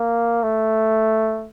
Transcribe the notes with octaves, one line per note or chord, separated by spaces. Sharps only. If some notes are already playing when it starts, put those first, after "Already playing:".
Already playing: A#3
A3